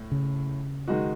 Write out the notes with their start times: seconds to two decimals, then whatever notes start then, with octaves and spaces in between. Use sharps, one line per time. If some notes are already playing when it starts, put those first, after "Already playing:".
Already playing: A2
0.11 C#3
0.88 D#3 G#3 D#4 F#4